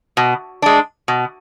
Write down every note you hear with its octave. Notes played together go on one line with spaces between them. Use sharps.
B2
G#3 D4
B2